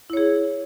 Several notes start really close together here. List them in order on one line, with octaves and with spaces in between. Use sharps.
E4 C#5 G#4